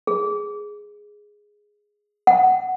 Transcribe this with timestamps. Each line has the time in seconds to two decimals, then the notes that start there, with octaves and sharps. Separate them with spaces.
0.07 G#4
2.27 F#5